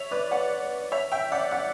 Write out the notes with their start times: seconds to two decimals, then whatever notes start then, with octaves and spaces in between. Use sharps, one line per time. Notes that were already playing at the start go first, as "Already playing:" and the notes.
Already playing: C#5 E5
0.11 B4 D5
0.31 D5 F#5
0.92 C#5 E5
1.12 E5 G5
1.32 D5 F#5
1.51 D5 F#5